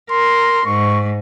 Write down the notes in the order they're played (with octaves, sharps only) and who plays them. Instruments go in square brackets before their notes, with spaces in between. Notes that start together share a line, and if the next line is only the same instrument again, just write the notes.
[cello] A#4 [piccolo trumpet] C6
[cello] G#2 [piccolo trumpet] C#6